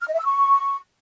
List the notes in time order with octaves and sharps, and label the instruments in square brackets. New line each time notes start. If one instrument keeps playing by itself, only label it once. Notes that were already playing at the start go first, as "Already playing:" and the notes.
[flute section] F6
D#5
E5
E6
C#6